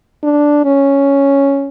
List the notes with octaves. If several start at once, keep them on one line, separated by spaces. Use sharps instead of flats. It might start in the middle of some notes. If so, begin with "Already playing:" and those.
D4
C#4